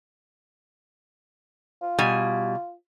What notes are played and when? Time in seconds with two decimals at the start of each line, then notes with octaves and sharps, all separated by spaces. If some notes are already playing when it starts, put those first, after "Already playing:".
1.82 F4
1.99 B2 G3 G#5